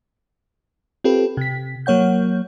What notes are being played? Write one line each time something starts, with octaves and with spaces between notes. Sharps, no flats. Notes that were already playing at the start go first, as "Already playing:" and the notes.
C4 F4 G4 A4 B4
C3 B6
F#3 A#3 C#5 F#5 G6